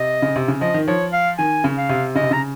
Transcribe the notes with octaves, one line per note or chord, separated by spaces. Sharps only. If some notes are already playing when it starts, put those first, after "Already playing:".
Already playing: C3 D#5
C#3
C3
C#3
F3 D#5
D#3
F3 C#5
F5
D#3 G#5
C#3
F5
C3
C#3 D#5
C3
C#3 A#5